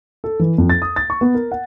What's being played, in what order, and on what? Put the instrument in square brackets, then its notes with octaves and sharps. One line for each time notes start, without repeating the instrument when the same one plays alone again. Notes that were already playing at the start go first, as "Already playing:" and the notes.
[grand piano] A4
E3
F2
A6
D#6
A6
C#6
B3
A#4
F#5